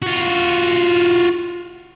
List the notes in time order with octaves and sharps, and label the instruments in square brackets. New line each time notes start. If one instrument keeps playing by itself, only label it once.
[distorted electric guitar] F4 F#4